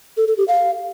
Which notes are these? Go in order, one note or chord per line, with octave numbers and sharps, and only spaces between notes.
A4
A4
G4
F5